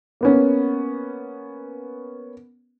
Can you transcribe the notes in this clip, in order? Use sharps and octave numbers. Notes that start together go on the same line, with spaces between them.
A#3 B3 C#4